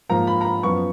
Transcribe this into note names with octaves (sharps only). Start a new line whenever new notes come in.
G#2 F3 A#3 A#5
B5
A#5
B5
F#2 F3 B3 C#6